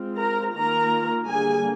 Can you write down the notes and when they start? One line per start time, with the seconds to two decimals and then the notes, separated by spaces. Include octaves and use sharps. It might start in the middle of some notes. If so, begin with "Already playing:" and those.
Already playing: G#3 C4 F4
0.17 A#4 A#5
0.54 D#3 A#3 F4 A#4 A#5
1.29 D3 G3 A#3 G#4 G#5